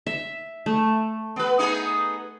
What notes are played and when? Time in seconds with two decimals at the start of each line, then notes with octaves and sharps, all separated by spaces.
0.07 E5
0.66 A3
1.36 B3 B4
1.59 B3 D#4 G#4